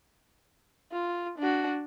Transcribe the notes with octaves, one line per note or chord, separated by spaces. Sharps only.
F4
D4 F#4